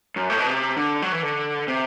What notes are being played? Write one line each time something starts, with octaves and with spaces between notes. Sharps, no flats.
F#2
A2
B2
C3
D3
F#3
E3
D3
C3